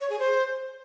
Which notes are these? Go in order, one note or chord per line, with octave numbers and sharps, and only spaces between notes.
C#5
G#4
C5